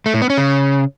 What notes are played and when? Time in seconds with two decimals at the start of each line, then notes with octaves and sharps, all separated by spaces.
0.06 A3
0.14 A2
0.22 B3
0.30 C#4
0.38 C#3